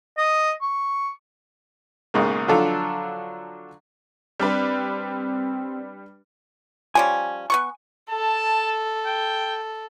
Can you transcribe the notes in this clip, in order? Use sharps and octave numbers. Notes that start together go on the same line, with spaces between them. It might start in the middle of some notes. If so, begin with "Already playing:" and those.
D#5
C#6
B1 G#2 C#3 A#3
D3 F3 F#3 D4 F4 A4
G3 C4 D4 B4
F3 G3 C#4 G#5
B3 B4 C#6
A4 A5
G5